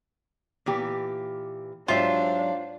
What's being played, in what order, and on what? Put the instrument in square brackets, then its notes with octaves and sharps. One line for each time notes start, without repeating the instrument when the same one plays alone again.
[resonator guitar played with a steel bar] A#2 E3 G4
[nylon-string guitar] G#2 F#3 G4 [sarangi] D4 [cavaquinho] F4 [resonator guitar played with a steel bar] C5 E5